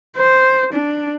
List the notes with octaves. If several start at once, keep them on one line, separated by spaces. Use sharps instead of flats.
C5
D4